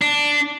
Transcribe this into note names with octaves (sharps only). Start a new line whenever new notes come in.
D4